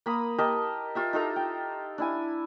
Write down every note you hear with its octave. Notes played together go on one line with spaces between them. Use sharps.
A#3 B5 D#6
G4 A#4 D#5 A5
F4 G4 E5
D#4 F4 A4 A#5
G5
D4 E4 G#5